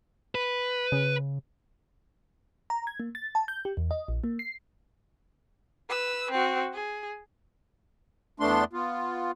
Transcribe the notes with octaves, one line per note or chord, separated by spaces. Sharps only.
B4
C#3
A#5
G#6
A#3
A6
A5
G6
G4
E2
D#5
A#1
A#3
C7
B4 E6
C4 F#4
G#4
E2 A3 B3 D4 C6
B3 F4